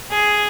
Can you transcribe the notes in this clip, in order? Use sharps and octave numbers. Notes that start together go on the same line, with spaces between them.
G#4